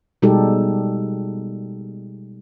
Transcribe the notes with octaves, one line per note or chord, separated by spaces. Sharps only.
B2 G3 G#3 D#4 G4 A4